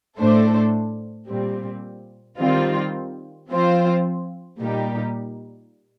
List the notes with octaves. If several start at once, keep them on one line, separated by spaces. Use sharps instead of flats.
A2 A3 D4 A4 C5
A#2 G3 C4
D#3 G3 C4 F4
F3 C4 F4 C5
A#2 G3 A#3 D#4 G4